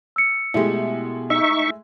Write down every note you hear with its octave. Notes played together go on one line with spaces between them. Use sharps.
E6 C#7
B2 G#3 A3 E4 G4
D#4 E5 C#6 E6